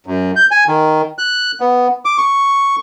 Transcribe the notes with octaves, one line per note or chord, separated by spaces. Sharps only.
F#2
G6
G#5
D#3
F#6
B3
D6
C#6